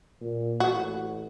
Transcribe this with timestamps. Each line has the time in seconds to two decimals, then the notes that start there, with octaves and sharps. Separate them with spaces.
0.21 A#2
0.60 A1 F#4